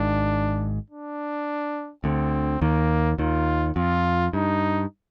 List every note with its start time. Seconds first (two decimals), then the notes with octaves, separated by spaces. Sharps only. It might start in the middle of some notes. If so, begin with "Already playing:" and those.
Already playing: G#1 G#2 D4
0.90 D4
2.04 D2 D3 C4
2.61 D#2 D#3 A#3
3.19 D#2 D#3 F4
3.76 F2 F4
4.33 G2 D#4